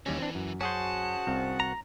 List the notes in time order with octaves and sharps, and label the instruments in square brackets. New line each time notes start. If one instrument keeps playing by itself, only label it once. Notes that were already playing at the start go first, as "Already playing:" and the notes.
[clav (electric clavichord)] D#2 G3 C#4 [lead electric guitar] E3
[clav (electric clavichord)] C4 D4
F#2
[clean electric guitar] C#4 G#4 C5 [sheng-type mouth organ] F#4 F#5 [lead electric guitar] A5
[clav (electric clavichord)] C2 C4 F5
[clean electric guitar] A#5